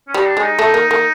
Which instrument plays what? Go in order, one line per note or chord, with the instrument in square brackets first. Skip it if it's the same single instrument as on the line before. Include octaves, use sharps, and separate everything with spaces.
[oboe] C#4
[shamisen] G3 [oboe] D#4
[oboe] D4
[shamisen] G#3 [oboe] D#4
[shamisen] A3
A#3
A#3